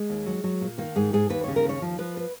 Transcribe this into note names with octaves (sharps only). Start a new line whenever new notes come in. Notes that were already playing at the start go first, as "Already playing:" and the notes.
Already playing: G#3
D#2
F#3
F#3
A#2
D#3 A#3
G#2 G#4
G#2 G#4
D#2 B4
C#3 C#5
A#4
D#2
C#5
F3
F3 B4
B4